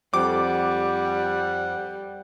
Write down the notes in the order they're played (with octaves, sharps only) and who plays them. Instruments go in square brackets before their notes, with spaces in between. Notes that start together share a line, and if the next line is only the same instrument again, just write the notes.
[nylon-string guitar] F2 [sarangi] G3 [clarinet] F#5 [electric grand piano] D6